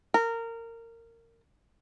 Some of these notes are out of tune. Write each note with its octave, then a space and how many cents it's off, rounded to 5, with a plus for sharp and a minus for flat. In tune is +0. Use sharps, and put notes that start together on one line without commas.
A#4 -20